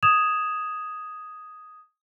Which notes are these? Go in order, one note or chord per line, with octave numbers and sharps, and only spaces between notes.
D#6 G#6 E7 F7